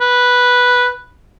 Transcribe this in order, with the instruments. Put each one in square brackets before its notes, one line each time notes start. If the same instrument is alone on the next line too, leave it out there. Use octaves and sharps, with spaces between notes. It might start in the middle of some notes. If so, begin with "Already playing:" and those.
[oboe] B4